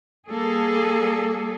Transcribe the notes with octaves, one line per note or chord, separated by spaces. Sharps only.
G3 A#3 G#4 A4